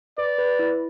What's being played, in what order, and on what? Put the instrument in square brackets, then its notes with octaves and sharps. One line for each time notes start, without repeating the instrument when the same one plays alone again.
[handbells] B4 [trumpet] D5
[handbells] B4
E4